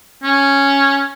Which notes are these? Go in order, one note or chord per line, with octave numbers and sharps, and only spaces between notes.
C#4